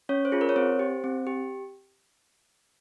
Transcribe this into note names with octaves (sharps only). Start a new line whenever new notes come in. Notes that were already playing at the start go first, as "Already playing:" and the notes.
C#4 C#5
C5
F4 G#4
A#4
C#5
C4 C5
G4
C4
G4